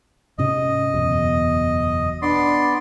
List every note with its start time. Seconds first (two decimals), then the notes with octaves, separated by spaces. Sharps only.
0.38 G#2 C3 C#4 D#5
0.94 F#1 E2 B2
2.22 B3 D4 D5 C6